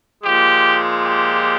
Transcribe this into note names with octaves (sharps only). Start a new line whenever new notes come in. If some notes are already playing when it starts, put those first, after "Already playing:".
A#2 F3 G#3 G4
G4